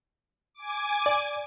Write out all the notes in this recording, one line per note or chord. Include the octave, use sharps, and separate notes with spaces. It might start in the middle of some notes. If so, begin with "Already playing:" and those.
G#5 D6
D5